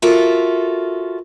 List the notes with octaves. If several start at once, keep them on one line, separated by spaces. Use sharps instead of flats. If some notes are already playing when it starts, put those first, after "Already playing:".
F4 F#4 A4 A#4 E5